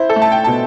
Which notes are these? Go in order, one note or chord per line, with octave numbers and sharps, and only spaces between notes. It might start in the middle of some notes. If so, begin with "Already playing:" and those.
Already playing: E4 C5
A4
A3
A5
G5
B2 A5